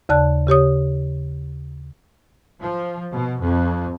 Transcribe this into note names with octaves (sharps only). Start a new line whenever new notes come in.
D#2 C#3 D5 A5 F#6
C#3 G4 C#5 D#6
F3
B2
F2